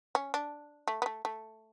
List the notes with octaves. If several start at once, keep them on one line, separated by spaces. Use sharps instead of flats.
C#4
D4
A3
B3
A3
A3